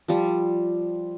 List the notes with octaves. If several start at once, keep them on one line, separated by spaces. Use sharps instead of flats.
F3 G3